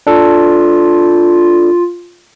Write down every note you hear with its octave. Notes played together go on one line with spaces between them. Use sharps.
D4 F4 A4